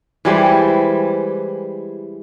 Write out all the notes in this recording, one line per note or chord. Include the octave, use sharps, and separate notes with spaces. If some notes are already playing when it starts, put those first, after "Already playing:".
E3 G3 G#3 C5